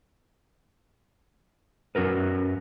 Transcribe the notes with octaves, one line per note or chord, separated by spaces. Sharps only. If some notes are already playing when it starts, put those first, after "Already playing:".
F#2 C#4 F#4 A#4 B4